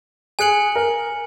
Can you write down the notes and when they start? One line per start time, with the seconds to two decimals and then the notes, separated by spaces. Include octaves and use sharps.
0.39 G#4 G#5 F#6 C#7 F#7
0.76 A#4